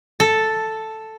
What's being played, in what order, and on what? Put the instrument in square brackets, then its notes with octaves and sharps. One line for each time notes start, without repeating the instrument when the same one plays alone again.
[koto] A4